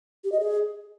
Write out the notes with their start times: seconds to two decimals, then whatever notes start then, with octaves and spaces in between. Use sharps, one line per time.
0.24 G4
0.32 D#5
0.40 G#4